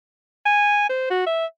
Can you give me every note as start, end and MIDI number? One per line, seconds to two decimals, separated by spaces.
0.46 0.89 80
0.89 1.09 72
1.10 1.26 66
1.27 1.46 76